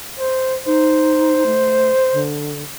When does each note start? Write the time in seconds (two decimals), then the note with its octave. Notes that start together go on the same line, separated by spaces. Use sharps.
0.19 C5
0.66 D#4 C5
1.46 A3
2.13 D3